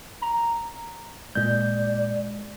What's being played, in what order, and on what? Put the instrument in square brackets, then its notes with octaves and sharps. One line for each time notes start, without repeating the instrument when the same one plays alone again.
[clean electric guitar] A#5
[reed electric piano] A#2 G6 [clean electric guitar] G#3 [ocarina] D5